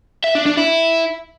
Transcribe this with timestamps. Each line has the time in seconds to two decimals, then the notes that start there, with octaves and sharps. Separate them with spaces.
0.24 E5
0.35 D4
0.46 D4
0.58 E4